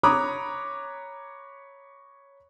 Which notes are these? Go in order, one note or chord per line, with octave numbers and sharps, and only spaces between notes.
C#5 A#5 B5 D6 D#6 F#6